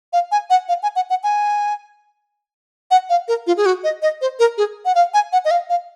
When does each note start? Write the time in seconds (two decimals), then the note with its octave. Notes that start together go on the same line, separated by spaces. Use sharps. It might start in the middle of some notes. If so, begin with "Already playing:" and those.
0.13 F5
0.31 G#5
0.50 F#5
0.68 F5
0.83 G#5
0.96 F#5
1.10 F#5
1.24 G#5
2.91 F#5
3.09 F5
3.28 A#4
3.47 F4
3.57 G#4
3.66 F#4
3.84 D#5
4.02 D#5
4.21 C5
4.39 A#4
4.58 G#4
4.85 F#5
4.95 F5
5.14 G#5
5.32 F#5
5.45 D#5
5.51 F5
5.69 F5